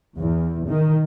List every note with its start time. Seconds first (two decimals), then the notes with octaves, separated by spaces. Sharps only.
0.17 E2
0.68 D#3